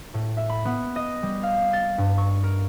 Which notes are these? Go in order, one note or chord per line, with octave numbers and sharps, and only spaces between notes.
A2
E5
B5
B3
D#5
G3
F5
A6
G2
C#6
A#4